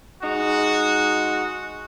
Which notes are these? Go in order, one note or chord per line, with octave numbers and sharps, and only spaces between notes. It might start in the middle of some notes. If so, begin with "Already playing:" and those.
G#3 D#4 F#4